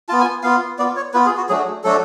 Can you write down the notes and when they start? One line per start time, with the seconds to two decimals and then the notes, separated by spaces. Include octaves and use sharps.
0.09 B3 F4 A5
0.21 G#5
0.43 B3 F4 F5
0.79 B3 F4 D5
0.96 C#5
1.14 B3 F4 B4
1.26 G#4
1.37 F#4
1.49 F#3 A3 D4 F#4 G#4
1.84 F#3 A3 D4 F#4 A4